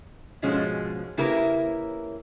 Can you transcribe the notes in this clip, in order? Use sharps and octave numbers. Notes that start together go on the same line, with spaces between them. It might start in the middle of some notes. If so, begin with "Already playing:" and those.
G#2 B2 F3 G#3 C#4
C#3 A#3 E4 G4 A#4 B4